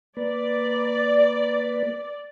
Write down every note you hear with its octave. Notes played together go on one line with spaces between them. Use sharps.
A#3 B4 D5